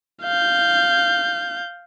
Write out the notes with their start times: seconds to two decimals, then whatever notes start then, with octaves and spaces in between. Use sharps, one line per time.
0.23 F5 G6